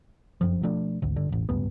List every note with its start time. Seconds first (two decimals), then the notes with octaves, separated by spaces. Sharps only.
0.41 F1 F#2 F3
0.63 B2 F3 A3 D4
1.02 G#1 D2
1.16 G1 D3
1.29 E1 A1
1.49 D1 C#2 G2 B3